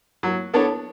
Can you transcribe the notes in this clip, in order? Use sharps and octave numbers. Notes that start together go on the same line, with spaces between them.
F#3
B3 D4 A4 C#5